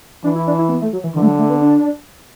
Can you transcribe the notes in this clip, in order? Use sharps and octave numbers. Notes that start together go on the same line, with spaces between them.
E3 D4
E4
D4
E4
B3
A3
F#3
E3
D3 E3
A3
F#3
A3
B3
D4